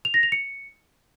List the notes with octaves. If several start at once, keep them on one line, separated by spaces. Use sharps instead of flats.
F7
A#6
F7
C#7